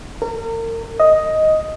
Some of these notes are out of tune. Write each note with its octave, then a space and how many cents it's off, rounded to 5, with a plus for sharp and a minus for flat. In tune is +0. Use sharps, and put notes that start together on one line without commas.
A#4 -35
D#5 +5